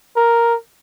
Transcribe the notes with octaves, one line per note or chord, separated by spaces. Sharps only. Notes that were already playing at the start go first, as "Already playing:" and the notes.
A#4